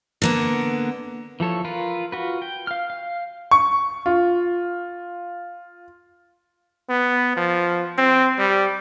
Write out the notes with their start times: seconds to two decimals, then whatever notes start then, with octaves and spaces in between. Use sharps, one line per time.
0.22 D3 A#3 B3
1.40 E3 F3 A4 C#5
1.65 F4 A#4 B4
2.12 F4 F#4 B4
2.42 G5
2.67 F5 F6
2.90 F5
3.51 C#6
4.06 F4
6.89 B3
7.36 F3
7.98 C4
8.39 G3